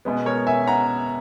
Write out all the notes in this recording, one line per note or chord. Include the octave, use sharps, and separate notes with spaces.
B2 G#3 B3
A#4 C#5
E5 G#5
F#5 A#5